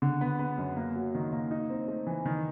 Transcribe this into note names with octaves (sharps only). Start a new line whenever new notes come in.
D3
B3
B3
F#2
A#3
F#3
D#3
A#3
D#4
C4
A3
E3
D#3